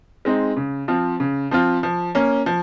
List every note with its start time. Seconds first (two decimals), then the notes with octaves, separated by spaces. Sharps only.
0.25 G#3 C4 D#4
0.57 C#3
0.88 F3 C4 F4
1.20 C#3
1.51 F3 C4 F4
1.83 F3
2.15 A#3 C#4
2.46 F3